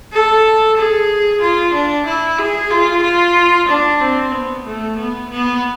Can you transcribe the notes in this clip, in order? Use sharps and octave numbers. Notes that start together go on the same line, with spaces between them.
A4
G#4
F4
D4
E4
G#4
F4
F4
D4
C4
B3
A3
B3
B3